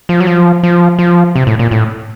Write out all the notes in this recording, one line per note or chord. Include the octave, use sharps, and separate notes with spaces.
F3
F#3
F3
F3
F3
C3
A2
A#2
A2